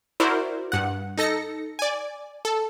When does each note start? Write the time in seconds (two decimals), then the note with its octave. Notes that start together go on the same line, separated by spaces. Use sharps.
0.20 E4 F#4 A#4 C5 D5
0.72 G2 F#5
1.17 D#4 A4 A#6 C#7
1.79 D5 G#5
2.45 A4